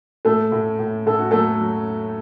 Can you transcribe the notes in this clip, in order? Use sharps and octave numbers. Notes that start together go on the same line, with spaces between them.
A2 A3 A4
A2
A2
A2 A4
F#4
F#3 A3 A4
F#3